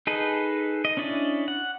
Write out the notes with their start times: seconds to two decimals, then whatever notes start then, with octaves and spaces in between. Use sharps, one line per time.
0.07 D#4 G#4 A4 B4 D#5
0.85 D#5
0.97 C#4 D4 E4 D5 D#5
1.48 F#5